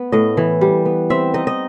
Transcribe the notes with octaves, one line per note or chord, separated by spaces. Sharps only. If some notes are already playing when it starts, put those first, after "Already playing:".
Already playing: B3
A2 D#5
E3
G3
B3
C4 E5
D#4 D#5
D#5